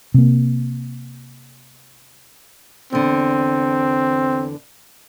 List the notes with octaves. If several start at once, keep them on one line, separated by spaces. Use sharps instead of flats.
C3 A#3
E2 D3 C4